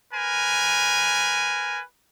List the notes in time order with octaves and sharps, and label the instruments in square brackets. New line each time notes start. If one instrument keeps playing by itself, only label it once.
[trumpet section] A#4 B4 G#5